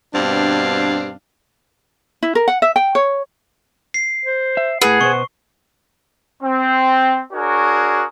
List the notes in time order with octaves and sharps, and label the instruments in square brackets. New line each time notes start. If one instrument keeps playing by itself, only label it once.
[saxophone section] G2 B2 C4 D4 F5
[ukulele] E4
A#4
F#5
E5
G5
C#5
[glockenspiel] C7
[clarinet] C5
[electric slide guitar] E5
[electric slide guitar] A2 B4 [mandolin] G#4 [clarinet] F#5
[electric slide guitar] B2 B3 C5 [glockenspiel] C#6
[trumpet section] C4
D4 F#4 G#4 A#4 C#5